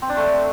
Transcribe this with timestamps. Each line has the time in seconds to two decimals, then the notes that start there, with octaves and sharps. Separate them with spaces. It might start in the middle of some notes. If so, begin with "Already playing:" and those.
0.02 C4
0.09 D4
0.17 A3